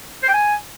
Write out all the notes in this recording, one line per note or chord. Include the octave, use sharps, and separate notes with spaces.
C5
G5
G#5